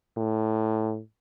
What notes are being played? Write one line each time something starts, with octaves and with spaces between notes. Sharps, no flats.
A2